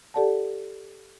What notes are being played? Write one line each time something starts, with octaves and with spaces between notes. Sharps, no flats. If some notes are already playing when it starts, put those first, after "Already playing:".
G4 A4 D5 F#5 A5